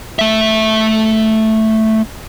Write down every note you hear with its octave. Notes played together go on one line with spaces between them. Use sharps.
A3 E5